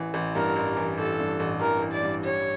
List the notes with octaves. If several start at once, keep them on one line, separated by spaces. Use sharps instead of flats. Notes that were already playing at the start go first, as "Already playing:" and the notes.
Already playing: A1 E3
A1
G2 A#4
A1
E3
A1 A4
G2
A1
E3 A#4
A1
D5
G2
G4 C#5